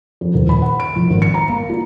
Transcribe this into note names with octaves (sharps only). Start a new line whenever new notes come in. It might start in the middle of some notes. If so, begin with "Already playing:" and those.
F2
D#1
B5
F#5
D7
A#1
G#1
C#7
A#5
A#3
F4